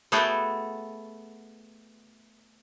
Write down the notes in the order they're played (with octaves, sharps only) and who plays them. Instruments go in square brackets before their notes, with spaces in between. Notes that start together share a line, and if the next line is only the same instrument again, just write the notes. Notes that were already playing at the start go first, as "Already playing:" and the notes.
[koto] A3 B3 F#4 G#4 A4 G5